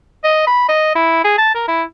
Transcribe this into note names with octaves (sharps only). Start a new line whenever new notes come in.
D#5
B5
D#5
E4
G#4
A5
A#4
E4